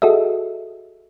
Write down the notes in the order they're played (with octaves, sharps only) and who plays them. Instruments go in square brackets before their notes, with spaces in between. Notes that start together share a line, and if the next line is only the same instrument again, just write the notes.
[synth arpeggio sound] F#4 G#4 A4 D#5 E5